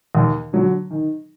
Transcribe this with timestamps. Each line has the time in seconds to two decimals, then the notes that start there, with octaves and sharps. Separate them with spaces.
0.15 D#2
0.53 D3 F#3
0.91 D#3